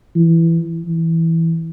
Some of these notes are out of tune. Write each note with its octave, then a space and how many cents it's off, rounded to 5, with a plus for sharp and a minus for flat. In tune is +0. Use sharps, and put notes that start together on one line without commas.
E3 +10
E3 -5